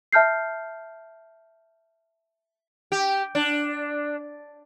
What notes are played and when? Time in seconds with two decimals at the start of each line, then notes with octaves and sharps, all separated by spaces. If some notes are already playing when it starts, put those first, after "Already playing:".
0.13 E5 A5 F6 G6 C7
2.92 G4
3.35 D4